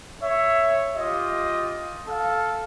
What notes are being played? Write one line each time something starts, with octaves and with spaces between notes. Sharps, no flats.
C#5 E5
F4 G4 D#5
A4 F5